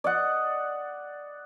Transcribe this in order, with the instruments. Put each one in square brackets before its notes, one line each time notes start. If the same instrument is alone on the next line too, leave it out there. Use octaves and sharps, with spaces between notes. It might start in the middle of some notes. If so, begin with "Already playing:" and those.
[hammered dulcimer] D5 D#5 F#5